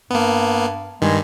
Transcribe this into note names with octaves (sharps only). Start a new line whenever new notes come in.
G2 A#3 B3
G2 D#3 G#3